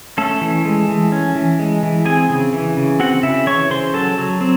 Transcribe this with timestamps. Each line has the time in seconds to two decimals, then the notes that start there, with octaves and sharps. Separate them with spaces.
0.18 A3 C#4 A4
0.41 E3
0.65 G#3
0.88 E3
1.12 C#4
1.35 E3
1.59 G#3
1.83 E3
2.05 C4 G#4 G#5
2.30 C#3
2.53 E3
2.77 C#3
3.00 C4 F#4 F#5
3.23 C#3 E4 E5
3.46 E3 C#5 C#6
3.70 C#3 C5 C6
3.94 F#3 A4 A5
4.18 F#3
4.41 C4